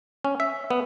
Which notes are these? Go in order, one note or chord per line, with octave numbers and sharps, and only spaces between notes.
C#4
E5
B3